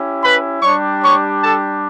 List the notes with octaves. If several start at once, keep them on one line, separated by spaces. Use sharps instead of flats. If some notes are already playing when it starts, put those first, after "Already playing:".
Already playing: C#4 E4 G4
B4 B5
G3 D4 G4 C#5 C#6
C#5 C#6
A4 A5